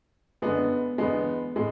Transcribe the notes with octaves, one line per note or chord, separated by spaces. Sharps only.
F#2 D3 G#3 B3
E2 D3 G#3 B3
A2 G#3